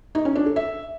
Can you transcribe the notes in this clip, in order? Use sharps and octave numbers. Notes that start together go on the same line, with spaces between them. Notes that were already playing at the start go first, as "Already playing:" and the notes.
D#4
C#4
D4
A4
E5